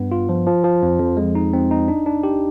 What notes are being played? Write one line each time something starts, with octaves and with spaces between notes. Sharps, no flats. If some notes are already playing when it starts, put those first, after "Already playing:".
Already playing: G2 B3
F4
F3
F3
F3
F2
F2
G#3
D#4
C4
D#4
D4
D4
G4